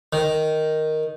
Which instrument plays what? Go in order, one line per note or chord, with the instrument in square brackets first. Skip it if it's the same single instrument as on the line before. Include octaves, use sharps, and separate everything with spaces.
[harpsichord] D#3